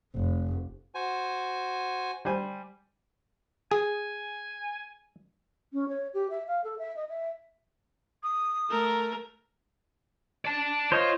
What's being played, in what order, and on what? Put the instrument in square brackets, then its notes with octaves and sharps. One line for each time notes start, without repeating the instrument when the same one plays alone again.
[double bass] F1
[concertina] F#4 C5 G#5
[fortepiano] G3 C5 G#5
[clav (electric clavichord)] G#4 [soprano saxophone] G#5
[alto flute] C#4
C#5
G4
E5
F5
A4
E5
D#5
E5
[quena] D#6
[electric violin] A3 A#4
[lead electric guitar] D5 A5
[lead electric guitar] F4 [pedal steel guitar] C5 C#5 D#5